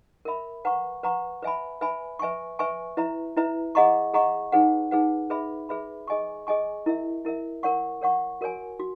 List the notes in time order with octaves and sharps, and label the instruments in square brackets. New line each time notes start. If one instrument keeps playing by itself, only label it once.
[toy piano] A#4 E5 B5
B4 F#5 A#5 C#6
B4 F#5 A#5 C#6
B4 E5 G#5 B5
B4 E5 G#5 B5
B4 E5 G#5 C#6
B4 E5 G#5 C#6
E4 B4 E5 A#5
E4 B4 E5 A#5
G#4 D#5 F#5 A#5 C#6
G#4 D#5 F#5 A#5 C#6
D#4 G#4 B4 F#5
D#4 G#4 B4 F#5
G#4 B4 E5 B5
G#4 B4 E5 B5
G#4 D#5 G#5 C#6
G#4 D#5 G#5 C#6
E4 A#4 E5
E4 A#4 E5
A#4 C#5 F#5 C#6
A#4 C#5 F#5 C#6
F#4 A#4 C#5 G#5
F#4